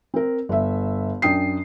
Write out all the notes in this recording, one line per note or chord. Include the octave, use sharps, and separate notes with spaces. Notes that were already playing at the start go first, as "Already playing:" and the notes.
C4 A#4
G1 E5
F#2 D4 G5 D#6 C7